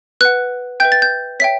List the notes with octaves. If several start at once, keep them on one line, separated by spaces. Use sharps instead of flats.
B4 F#5 F#6
B4 E5 G5 G6
A6
G6
C#5 E5 G5 B6